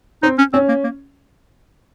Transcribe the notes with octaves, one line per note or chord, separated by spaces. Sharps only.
C4 D#4
C#4
C4 C#4
A#3
A#3